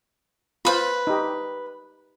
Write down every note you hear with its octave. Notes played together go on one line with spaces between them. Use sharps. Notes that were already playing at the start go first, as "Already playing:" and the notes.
F4 B4 C5 B5
D#4 G4